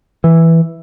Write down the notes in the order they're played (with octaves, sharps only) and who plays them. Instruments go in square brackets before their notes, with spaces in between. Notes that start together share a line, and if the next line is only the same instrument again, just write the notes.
[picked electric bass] E3